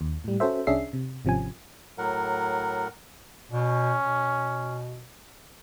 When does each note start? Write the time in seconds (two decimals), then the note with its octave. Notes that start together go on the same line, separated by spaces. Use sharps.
0.01 D#2
0.24 A2 G3
0.40 C#4 F#4 A4 C5 E5
0.67 C2 C#4 D4 G#4 E5 C7
0.93 C3
1.25 G#1 C3 F3 C#4 G#5
1.98 A2 F#3 A#4 F#5
3.51 B2 C#4
4.02 B2